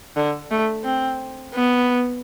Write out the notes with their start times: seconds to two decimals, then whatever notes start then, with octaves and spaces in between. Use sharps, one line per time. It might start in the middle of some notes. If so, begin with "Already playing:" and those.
0.16 D3
0.51 A3
0.84 C4
1.53 B3